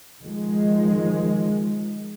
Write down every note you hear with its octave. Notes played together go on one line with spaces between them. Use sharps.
D#3 F3 G#3